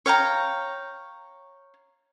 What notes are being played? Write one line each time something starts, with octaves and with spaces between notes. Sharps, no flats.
C#5 F5 G5 A#5